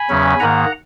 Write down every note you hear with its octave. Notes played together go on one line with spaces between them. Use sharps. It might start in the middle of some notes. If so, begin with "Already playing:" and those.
Already playing: G#5 B5
E2 C#3 F#3 C#4
G#2 D#3 A#3 F#5 A#5